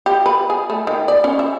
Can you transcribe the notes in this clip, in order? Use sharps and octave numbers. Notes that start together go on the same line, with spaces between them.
G4
B4
G#4
A3
D#3
D5
C#4
E5